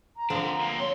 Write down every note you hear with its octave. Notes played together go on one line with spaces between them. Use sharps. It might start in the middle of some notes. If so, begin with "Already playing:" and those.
A#5
D3 F3 C4 D4 A#4
F2 A#3
C#3 C#5 C6